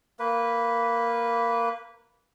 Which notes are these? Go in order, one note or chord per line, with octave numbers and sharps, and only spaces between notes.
A#3 B4